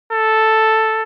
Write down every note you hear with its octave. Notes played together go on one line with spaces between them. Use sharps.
A4